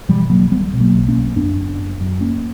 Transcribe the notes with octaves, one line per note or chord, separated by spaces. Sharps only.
B2 E3 G3
B1 F#3 A#3
B1 G3 B3
B2
F#3 A#3
B1
A#3 C#4
B1
F#2 B3 D4
F#1
F#1
F#2
F#1 A#3 C#4